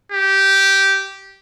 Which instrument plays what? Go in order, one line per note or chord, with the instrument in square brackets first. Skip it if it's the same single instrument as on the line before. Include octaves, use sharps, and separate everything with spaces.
[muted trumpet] G4